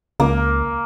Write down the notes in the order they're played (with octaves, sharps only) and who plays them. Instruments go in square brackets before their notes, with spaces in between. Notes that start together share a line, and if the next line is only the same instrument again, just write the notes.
[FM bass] C#2 [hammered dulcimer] A#3